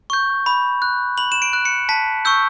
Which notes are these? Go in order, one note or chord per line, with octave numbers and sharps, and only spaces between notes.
C#6 G6
B5
F#6
B5 F#7
E7
D7
F#6
C#7
A5 B6
C#6 E6 G6